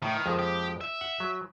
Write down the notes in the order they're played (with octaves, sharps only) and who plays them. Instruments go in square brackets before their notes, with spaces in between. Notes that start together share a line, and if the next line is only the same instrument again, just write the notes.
[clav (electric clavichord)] A2 [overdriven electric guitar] D#3
[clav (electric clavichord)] F2 F3 G#3
[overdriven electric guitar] G4
E5
[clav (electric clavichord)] F#5
F#3